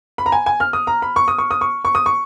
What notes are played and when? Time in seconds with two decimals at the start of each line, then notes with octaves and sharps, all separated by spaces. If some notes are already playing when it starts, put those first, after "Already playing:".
0.18 B5
0.26 A#5
0.32 G#5
0.46 G#5
0.60 F6
0.73 D#6
0.87 A#5
1.02 B5
1.16 C#6
1.28 D#6
1.38 C#6
1.51 D#6
1.61 C#6
1.85 C#6
1.95 D#6
2.06 C#6